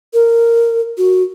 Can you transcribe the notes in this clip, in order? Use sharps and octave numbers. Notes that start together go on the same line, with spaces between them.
A#4
F#4